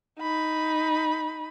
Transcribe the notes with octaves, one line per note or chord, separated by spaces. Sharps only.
D#4 B5